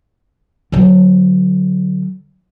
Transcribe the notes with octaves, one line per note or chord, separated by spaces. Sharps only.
D3 F#3